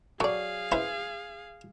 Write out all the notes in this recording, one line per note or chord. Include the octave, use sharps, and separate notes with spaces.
F#3 G#4 A4 D5 F5
C#4 E4 B4 C5 E5